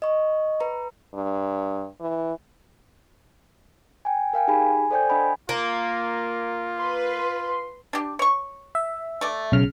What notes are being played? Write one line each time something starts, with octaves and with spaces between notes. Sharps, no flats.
D#5 C#6
B4 A#5
G2
E3
G5 G#5
A#4 F5 G5 G#5
D#4 G4 G#4 G#5 B5
G#5
A4 C5 D5 G5 G#5 G6
D4 D#5 F#5 G#5 B5
A#3 F4
B4 C6
D4 G4
C#5 C#6
E5
A3 D5
B1 C#3 F6